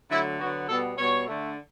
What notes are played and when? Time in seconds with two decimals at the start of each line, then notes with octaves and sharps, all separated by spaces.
0.10 D3 F#3 A3 E4
0.39 D3 F#3 B3 F#4
0.68 B2 G3 B3 A4
0.98 B2 G3 B3 C#5
1.27 D3 A3